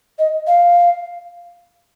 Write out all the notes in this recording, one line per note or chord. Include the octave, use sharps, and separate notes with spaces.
D#5
F5